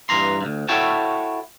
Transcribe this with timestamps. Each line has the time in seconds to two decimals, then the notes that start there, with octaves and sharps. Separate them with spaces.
0.09 G2 E3 A#5 C6
0.41 D2 G2
0.69 E4 F#4 A4 C#5 G5 A5